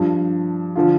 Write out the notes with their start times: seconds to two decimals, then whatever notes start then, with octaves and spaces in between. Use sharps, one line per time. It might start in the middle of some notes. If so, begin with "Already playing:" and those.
Already playing: G2 F3
0.75 D3 F3 F4